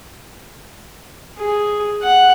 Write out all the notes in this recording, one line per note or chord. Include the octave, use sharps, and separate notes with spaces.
G#4
F#5